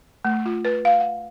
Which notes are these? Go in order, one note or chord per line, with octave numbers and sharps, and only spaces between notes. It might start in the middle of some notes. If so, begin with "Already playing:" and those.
A3
F4
B4
F5
F#5